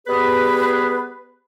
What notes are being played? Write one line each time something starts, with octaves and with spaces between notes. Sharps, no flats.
G3 B3 G#4 B4